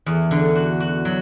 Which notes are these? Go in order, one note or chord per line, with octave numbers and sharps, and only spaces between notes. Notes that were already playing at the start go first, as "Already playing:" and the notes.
E2
D3
F#4
F#4
F#3